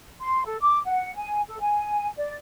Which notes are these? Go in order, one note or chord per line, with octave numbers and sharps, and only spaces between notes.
C6
A4
D6
F#5
G#5
A4
G#5
D5